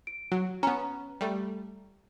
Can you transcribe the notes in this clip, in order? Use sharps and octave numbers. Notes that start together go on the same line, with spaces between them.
D7
F#3
B3 C#4 A#5
G3 A3